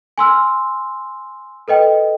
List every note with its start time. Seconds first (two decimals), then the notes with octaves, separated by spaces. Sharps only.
0.18 G#5 C6 E6 F6
1.68 A4 B4 D#5 G5